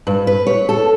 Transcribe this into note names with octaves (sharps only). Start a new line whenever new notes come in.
G2
B4
C#5
A4